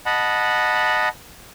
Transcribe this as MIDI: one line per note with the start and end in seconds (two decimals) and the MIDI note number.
0.06 1.09 75
0.06 1.09 78
0.06 1.09 81
0.06 1.09 83